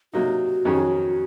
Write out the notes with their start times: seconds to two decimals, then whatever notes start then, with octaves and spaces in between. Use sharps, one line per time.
0.13 C3 F#3 A#3 D#4 F#4
0.65 F2 D#3 F#3 C#4 G#4